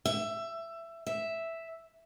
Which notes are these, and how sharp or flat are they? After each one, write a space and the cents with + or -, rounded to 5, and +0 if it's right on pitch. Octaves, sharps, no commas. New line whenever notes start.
E5 +15
E5 +0